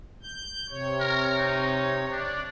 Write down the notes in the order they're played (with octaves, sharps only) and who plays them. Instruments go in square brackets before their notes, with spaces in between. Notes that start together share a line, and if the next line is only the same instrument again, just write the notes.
[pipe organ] G6
C3 C#5
[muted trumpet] A#4
D#4
[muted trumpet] D4 [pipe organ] D5